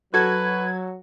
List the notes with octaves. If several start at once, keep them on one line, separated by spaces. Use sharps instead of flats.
F#3 F#4 A4 B4 G#6